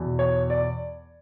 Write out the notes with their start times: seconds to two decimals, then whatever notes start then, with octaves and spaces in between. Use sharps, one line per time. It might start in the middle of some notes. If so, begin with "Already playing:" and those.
Already playing: E2 B2
0.19 C#5
0.50 D5